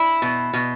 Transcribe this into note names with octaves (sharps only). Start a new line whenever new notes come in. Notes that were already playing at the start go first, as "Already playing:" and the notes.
Already playing: E4
B2
B2